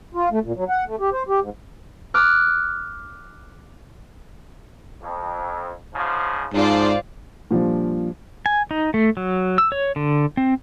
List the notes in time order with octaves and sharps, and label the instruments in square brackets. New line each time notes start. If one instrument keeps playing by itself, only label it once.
[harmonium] F4
A3
A#2
F#3
F#5
A3
G4
C5
G4
G#2
[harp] D6 F6 F#6
[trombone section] F2
G#2 C#3 F3
[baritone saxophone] G#2 [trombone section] F3 [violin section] F4 C5 D5
[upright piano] A#2 F3 G3 D4
[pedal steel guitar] G#5
D#4
A3
F#3
E6
C#5
D3
C4